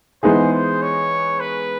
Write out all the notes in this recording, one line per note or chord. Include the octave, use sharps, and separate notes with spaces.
E3 G#3 B3 D#4 G#4 C5
C5
C#5
B4